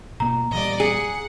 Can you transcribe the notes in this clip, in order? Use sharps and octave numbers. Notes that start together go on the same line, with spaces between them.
B2 A#3 A#5
A#2 E3 G3 D5 D#5
G#4 F#5